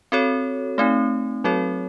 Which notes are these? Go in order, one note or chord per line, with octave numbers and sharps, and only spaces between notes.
C4 F#4 A4 C#5
A3 C4 D#4
F#3 C4 F#4 A4 C#5